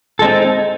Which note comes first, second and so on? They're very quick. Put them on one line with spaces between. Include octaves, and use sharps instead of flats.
A4 G#3 C4 D#4